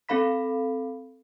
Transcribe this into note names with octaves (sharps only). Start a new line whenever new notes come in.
C4 A4 F5 B5 B6